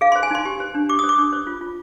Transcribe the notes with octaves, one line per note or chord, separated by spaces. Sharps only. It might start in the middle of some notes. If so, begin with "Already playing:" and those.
G#4 F5
C5 C6
G#5
D#4 C6
G4
C5
D4
G4 D6
C5 D#6
D6
D4
C5
F4
F4